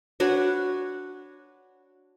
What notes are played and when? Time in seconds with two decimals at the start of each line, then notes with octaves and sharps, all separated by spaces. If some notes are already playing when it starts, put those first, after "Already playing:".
0.20 D4 F#4 B4 C#5